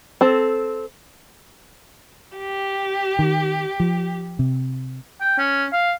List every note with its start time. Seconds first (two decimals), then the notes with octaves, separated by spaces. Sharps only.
0.21 C4 A4
2.38 G4
3.19 D#3
3.80 F3
4.39 C3
5.21 G5
5.39 C#4
5.73 F5